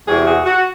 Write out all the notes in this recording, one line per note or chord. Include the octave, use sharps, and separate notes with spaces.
E2 C3 E3 F#4 G#4
F#4 G#4
F#4